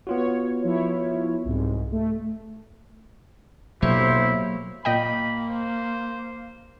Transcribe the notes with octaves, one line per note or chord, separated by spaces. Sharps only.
B3 F4 F#4 C#5
F3 E4 C#5
C2 G#2
A3
D2 B2 F#3 A#3 E4 G4 C5 C#5
A#2 A#3 D#5 G5 B5
C5